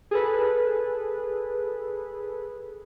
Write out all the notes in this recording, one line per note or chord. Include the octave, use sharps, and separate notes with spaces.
G#4 A4 B4